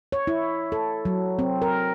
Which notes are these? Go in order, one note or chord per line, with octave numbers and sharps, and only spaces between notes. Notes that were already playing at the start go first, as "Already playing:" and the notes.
C#5
E4
A4
F#3
C4
A#4